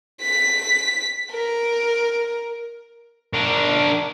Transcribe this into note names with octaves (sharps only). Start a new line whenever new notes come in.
B6
A#4
D4 A#4